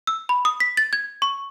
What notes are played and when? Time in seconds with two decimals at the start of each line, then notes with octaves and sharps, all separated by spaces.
0.07 E6
0.29 B5
0.45 D#6
0.60 B6
0.77 A6
0.93 G#6
1.22 C#6